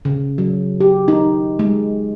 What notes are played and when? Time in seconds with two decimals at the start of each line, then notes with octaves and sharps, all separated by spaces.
0.05 C#3
0.38 F#3
0.80 G4
1.08 D#4
1.59 G#3